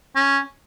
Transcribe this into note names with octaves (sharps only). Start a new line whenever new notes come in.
C#4